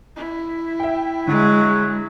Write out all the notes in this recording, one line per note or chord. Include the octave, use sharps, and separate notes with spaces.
E4
E5 G5
D3 F#3 G#3